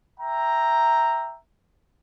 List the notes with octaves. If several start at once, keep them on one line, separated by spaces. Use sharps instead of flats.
E5 G5 A#5